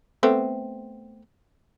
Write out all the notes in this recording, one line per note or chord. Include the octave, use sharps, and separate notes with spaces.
A3 B3 C4